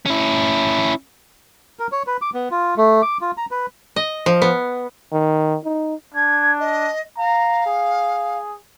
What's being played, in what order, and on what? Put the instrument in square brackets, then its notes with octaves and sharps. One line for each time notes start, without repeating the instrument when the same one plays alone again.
[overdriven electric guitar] C#4 E4
[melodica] A#4
C#5
B4
D6
B3
F4
A3
D6
F4
A#5
B4
[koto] D#5
F3
B3
[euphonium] D#3
D#4
[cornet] D4 [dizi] G#6
[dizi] D#5
[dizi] F5 [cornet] A#5
[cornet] G#4